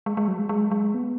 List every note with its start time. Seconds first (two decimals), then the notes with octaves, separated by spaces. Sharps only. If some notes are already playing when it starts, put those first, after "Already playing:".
0.06 G#3
0.17 G#3
0.28 F#3
0.39 G#3
0.49 G#3
0.71 G#3
0.94 B3